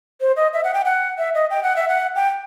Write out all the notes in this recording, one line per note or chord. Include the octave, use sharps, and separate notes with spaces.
C5
D#5
E5
F#5
G5
F#5
E5
D#5
G5
F#5
E5
F#5
G5